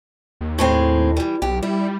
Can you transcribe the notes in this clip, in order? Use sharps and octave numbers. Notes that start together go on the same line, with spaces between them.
D#2
A2 G#3 C4
E3 G3
B1 G4
G3 E4